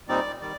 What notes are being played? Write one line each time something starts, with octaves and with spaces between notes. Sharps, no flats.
A#2 G3 C4 D#4 D5
D#3 G3 D5